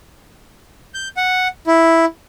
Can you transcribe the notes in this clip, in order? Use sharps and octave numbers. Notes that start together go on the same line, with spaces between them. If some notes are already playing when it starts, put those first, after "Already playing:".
G6
F#5
E4